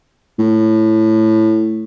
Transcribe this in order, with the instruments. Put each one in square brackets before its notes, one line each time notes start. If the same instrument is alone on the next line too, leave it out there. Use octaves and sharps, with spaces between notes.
[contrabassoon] A2